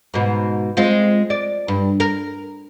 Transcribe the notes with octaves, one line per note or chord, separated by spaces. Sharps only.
G#2 B2
G#3 C4 F4
D5
G2
A#4